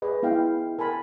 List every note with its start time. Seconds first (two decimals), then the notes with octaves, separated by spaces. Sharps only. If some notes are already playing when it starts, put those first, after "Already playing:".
0.02 G#4 B4 D#5
0.23 B3 E4 F5 G5
0.79 A#4 G#5 A5 B5